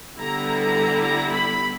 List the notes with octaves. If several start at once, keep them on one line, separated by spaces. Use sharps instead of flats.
D3 G3 B3 E4 A#5
A#5
A#5
B5